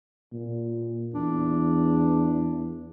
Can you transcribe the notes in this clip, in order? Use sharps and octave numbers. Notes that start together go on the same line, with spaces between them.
A#2
E2 D4